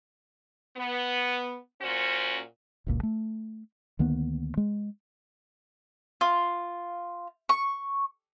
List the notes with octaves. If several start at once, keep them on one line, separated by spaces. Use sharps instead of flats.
B3
A#2 C#4 F#4 C5
F#1 C#2 A#2
A3
D2 D#3 A#3 B3
G#3
F4
C#6